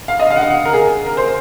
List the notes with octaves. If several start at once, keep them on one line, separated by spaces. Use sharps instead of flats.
F5
D#5
F5
F#5
F5
F#5
A#4
G#4
A#4
C5